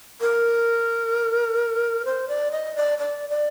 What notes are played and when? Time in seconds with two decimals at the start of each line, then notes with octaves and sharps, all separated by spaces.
0.21 A#4
2.05 C5
2.28 D5
2.52 D#5
2.76 D5
2.98 D5
3.30 D5